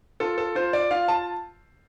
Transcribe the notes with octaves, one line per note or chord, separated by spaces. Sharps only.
F4 A4
A4
F4 C5
D5
F4 F5
A5